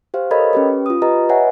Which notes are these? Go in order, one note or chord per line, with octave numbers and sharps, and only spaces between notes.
G4 C5 F5
A4 A#4 C#5 D#5 B5 G#6
C#4 G4 B4
F4 D#6
G4 B4 D#5 A#5
B4 C#5 D#5 E5 F#5 G#5